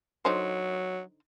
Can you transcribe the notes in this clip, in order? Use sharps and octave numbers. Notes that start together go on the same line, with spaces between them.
D3 F#3 D#4 C5